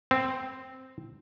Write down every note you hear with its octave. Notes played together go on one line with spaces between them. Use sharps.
C4